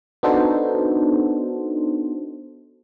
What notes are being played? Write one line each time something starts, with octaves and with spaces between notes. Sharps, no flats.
B3 D4 D#4 F#4 A4 C5